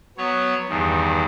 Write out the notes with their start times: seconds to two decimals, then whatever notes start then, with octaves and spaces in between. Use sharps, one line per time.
0.18 F#3 B3 C#5
0.69 E2 G2 D#3